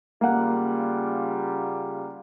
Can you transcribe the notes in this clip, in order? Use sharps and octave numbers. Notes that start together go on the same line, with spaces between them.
C#3 G3 A#3 F4 F#5